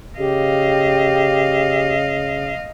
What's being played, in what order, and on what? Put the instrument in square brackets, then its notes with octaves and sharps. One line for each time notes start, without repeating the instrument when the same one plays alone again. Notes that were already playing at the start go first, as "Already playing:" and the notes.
[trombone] C#3 [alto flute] G4 [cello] D#5 F5